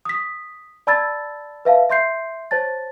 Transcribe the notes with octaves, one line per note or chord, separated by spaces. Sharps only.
D#6 B6
D5 A5 B5 E6 G#6 A6
B4 E5 F5 A5
E5 C6 G6 C7
C5 C#5 A5 A6